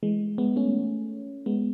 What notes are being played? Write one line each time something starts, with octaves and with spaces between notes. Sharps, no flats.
E3 G#3
G#3 B3
A3 C#4
G#3 B3